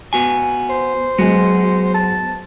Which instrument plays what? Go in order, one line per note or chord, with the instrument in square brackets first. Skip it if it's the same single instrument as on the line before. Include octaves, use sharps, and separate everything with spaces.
[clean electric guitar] B3 F#4 G#5
[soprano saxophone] C5
[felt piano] F#3 G#3 [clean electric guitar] B3 F#4
[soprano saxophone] A5